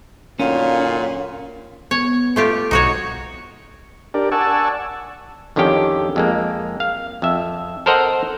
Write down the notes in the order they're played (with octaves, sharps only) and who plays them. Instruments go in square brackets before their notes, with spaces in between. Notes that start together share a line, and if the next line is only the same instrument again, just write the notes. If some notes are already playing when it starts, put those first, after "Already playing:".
[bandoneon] F#2 D3 D#3 [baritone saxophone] A#2 [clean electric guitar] C#4 [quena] F5
[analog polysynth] B3 [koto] C#5
[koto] A3 F4 G4
[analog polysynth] B1 [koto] D#4 F#4 C#5
[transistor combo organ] D4 G4 A#4 D5
D5 F#5 G#5 A5 C#6 E6
[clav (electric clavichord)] F2 D3 D#3 C#4 G4 G5
F2 G#3 A#3
F5
F2 E5
A4 A#4 C5 D#5 F#5 A#5